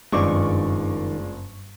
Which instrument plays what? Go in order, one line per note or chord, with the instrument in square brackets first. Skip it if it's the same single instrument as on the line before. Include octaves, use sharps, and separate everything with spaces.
[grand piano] F#1 D6 [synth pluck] G2 C#6 [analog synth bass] D#3 [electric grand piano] G#3 F4 D5